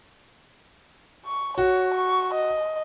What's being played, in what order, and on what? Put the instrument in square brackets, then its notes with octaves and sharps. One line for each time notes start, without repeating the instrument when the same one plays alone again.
[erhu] C#6
[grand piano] F#4 [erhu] C#5
[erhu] C#6
D#5